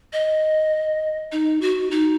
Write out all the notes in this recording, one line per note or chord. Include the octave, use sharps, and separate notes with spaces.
D#5
D#4
F#4
D#4